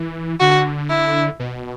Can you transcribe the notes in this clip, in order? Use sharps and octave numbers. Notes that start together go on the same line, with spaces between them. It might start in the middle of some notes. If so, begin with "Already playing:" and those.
Already playing: E3
D3 F#4
E4
B2